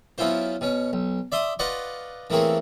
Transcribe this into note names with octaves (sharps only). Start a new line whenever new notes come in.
F#3 B3 C#4 E4 F4 C5
B2 C#4
B1
D5 E5 C6 D#6
F4 B4 D5 D#5 F#5 C#6
E3 A3 A#3 C4 G#4 C#5